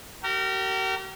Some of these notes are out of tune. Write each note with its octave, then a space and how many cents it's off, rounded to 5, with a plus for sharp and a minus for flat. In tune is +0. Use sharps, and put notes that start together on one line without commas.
G4 -45 A#4 -25